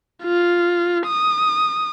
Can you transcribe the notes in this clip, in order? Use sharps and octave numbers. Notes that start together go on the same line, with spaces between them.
F4
D#6